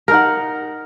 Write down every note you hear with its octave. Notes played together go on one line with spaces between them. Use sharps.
D#4 A#4 F#5